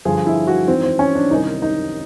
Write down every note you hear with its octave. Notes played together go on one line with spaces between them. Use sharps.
G2 D3 F3 G#4
E4
F#4
G#2 E3 C4
C4
C#4
D4
C2 C3 D#3 D#4
D#4